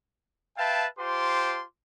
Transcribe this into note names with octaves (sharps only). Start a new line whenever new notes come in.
B4 E5 F5 G5 A5
F4 G4 C5 A5 C6 D6